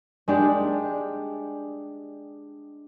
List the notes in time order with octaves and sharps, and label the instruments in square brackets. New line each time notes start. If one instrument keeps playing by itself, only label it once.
[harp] G#3 D4 G4